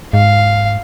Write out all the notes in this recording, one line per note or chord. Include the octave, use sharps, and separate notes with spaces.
G#2 F5